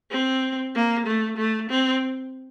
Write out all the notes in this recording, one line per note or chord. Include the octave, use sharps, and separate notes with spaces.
C4
A#3
A3
A3
C4